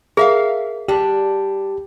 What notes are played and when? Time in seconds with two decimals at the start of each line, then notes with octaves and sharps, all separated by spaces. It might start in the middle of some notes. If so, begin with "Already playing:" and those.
0.17 G#4 A#4 E5 F5
0.88 G3 D4 G4